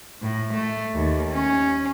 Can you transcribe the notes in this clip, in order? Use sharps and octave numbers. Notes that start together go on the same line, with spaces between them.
A2
A3
D#2
C#4